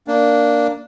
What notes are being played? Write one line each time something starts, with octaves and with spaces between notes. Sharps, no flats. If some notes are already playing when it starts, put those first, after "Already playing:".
A#3 D4